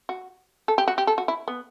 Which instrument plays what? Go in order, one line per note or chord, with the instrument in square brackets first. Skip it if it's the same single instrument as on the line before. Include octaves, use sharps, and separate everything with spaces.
[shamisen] F#4
A4
G4
F#4
G4
A4
F#4
E4
B3